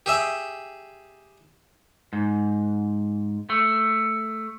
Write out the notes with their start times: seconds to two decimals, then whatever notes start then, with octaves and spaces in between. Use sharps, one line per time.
0.06 G4 G#4 E5
2.13 G#2
3.50 A3